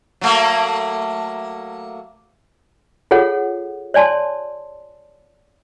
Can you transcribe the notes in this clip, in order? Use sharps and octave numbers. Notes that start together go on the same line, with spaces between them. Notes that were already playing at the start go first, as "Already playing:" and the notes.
F#3 A3 A#3
F4 G#4 A4 C#5 F#5
C#5 D5 G#5 A5 C6